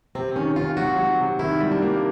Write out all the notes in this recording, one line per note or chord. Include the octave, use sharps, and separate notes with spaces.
C3 C4
D#3 C#4
D#3 F4
F#3 F#4
F#3
C3
D#3 E4
G3
D4
A#3